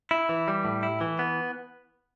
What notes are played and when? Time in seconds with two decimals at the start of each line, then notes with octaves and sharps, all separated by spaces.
0.11 E4
0.29 E3
0.48 G3
0.65 A2
0.83 E4
1.01 E3
1.19 B3